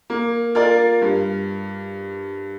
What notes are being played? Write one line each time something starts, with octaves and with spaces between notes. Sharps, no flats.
A#3
F4 A#4 D5
G2